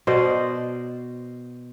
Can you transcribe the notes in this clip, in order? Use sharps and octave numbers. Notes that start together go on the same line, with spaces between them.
B2 C5 D5 D#5